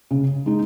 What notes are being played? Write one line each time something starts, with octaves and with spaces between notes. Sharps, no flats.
C#3
G#3 D#4